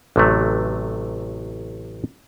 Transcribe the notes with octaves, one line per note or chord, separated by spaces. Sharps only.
A1 C3 F#3 A3